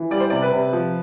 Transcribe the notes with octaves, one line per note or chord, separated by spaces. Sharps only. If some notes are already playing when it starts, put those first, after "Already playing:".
Already playing: E3
G3 D5
C5
C3 D5
B4
C3
F3